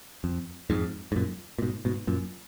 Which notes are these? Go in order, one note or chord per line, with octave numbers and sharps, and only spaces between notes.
F2
F2 G#2
G#2
F#2 A#2
A#2
G#2 B2
G#2 B2
F#2 A#2